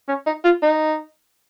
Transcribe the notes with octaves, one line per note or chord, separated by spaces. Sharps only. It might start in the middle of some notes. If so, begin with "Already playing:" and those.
C#4
D#4
F4
D#4